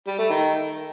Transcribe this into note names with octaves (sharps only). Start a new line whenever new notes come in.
G3
A3
D#3